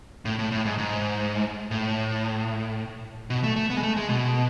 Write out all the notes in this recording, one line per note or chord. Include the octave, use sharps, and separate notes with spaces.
A2
A2
A2
G#2
G#2
A2
B2
A3
A3
B3
G#3
A3
G#3
B2